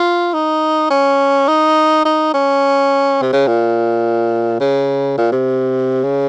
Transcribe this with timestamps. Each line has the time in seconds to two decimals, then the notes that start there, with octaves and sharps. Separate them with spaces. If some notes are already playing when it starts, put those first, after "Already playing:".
Already playing: F4
0.34 D#4
0.90 C#4
1.48 D#4
2.05 D#4
2.34 C#4
3.22 C3
3.33 C#3
3.47 A#2
4.60 C#3
5.18 A#2
5.32 C3
6.04 C#3